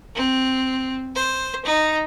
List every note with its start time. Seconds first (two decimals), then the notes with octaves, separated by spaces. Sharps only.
0.15 C4
1.15 C5
1.65 D#4